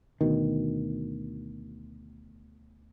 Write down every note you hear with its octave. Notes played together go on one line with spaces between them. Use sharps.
D2 B2 D#3